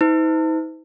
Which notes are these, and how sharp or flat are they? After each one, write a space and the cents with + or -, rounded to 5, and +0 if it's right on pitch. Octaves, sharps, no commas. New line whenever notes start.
D#4 +45 C5 -45